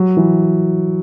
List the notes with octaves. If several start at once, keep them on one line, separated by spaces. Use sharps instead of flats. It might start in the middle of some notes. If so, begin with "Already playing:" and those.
Already playing: F#3
E3